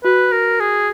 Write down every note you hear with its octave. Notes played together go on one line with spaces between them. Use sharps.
F#4 B4
A#4
G#4